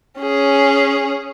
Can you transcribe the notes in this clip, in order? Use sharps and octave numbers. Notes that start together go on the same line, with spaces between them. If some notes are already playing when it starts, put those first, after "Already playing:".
C#4 G#4